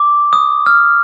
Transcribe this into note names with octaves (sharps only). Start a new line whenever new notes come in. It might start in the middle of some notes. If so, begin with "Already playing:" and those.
Already playing: D6
D#6
F6